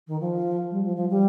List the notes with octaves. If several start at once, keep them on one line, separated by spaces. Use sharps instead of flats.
D#3
F3
G3
F3
F3
G3